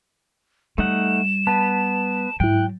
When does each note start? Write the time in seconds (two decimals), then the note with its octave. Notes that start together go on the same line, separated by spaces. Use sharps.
0.78 G3 A3 D#4 F#5 E7
1.47 B3 B4 A5
2.40 G#2 F#3 E4 G5 F#6